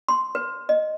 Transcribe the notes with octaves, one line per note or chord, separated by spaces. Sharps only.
C6
B4
D#5